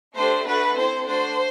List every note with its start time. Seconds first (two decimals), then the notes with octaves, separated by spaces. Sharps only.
0.15 A3 D4 G4 C5
0.45 A3 D4 F#4 A4 B4
0.76 C4 E4 A4 C5
1.07 A3 D4 F#4 C5